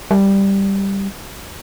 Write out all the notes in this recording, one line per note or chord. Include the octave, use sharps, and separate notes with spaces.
G3